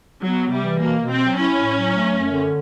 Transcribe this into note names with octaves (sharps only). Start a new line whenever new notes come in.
F#3 B3
C3
G3
E3
B2 A#3
B2
C4
F#3
C#4 E4
A2
F#3
A3
F#2
D3